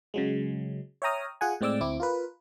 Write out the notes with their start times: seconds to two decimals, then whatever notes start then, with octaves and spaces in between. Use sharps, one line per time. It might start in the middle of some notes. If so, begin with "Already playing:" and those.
0.14 C#3 F#3 G#3
1.02 C#5 E5 G5 A#5 D#6 F6
1.41 F4 G#4 F#5 G#5
1.61 A2 G#3 C4 D5 D6 E6
1.80 D2 C4 E4 D6
2.00 F4 A#4 B4